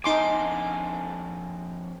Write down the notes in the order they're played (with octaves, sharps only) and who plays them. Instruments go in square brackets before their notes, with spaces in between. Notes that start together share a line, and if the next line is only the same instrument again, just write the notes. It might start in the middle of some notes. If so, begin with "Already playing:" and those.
[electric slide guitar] F2 D4 G#5 [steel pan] D#4 C6 D6